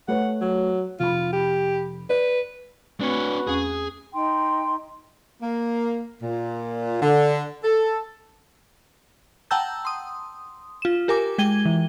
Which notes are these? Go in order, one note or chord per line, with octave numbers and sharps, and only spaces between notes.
A3 B4 C#5 F#5
F#3
F1 F4 B5
G4
B4 D5
A3 C4 D4 F#4 B4 C#5
E2 C#4 G#4 C#6
D#4 G5 C6
A#3
A#2
D3
A4
F#5 G5 A5 A#5 E6 G6
C6 D#6
F4 E7
G4 A#4 G#5 D6
G#3 G5 G#6 D#7 G7
E3